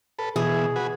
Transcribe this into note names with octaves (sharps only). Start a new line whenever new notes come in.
A4 B4
B2 E3 G#4
F#4 B4 G#5